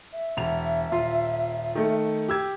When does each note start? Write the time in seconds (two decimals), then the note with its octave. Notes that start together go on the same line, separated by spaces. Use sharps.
0.13 E5
0.37 E1 F7
0.92 D#1 F4 C6
1.75 D#3 A3
2.28 G4 E6 G#6